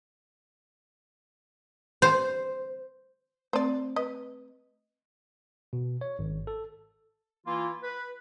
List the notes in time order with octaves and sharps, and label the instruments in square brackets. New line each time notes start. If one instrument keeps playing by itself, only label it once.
[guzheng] C5
[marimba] A3 C4 [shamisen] C5 D5
[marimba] B4 [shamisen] D#5
[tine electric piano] B2
C#5
G#1
A4
[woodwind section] E3 A#3 E4 F4
B4